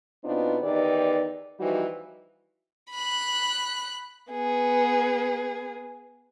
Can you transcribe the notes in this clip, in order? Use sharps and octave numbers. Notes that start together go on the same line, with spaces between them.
B2 B3 C4 D4 D#4 F4
E2 D#3 E3 D#4 G4 D5
E3 F3 G3 D#4 F#4
B5 F#6
B3 G#4